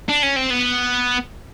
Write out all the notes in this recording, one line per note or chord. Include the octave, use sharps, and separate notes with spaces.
D4
C#4
C4
B3